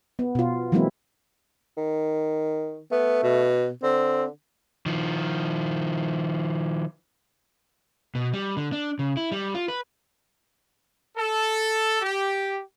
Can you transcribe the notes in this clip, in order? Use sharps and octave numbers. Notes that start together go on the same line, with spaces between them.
B3
B2 F4
E3 F#3 G#3 A#3 C4 E4
D#3
A3 B3
B2
D3 C4
D#3 F3
B2
G3
D3
D4
C#3
E4
G3
F4
B4
A4
G4